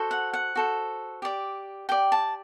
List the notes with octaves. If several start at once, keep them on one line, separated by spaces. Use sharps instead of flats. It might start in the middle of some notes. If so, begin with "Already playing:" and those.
Already playing: F#4 A4 C5
F#5
F#5
F#4 A4 C5
G4 D5
G4 D5 G5
A5